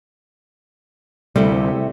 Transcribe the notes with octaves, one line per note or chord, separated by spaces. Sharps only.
D2 C3 G3 A3 E4